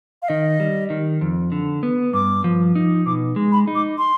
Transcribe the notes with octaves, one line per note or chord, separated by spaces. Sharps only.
F5
D#3 D#5
G3
D#3
F2
D3
B3
G2 D6
F3
D#4
B2 D6
G#3
B5
D#4
D6
C6